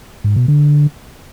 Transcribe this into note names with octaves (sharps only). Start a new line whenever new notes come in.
G#2
B2
D3